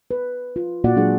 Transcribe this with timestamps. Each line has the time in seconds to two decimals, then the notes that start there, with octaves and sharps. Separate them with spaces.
0.11 B4
0.56 F4
0.84 A#2 A#3 F4 F#4 D5 F#5
0.96 F#3 G#3 D4 G#4 F#5